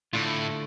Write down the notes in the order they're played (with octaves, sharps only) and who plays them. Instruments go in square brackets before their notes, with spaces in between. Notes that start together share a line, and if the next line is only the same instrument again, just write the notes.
[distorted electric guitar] A2 [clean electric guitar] D3 A3 D4 F4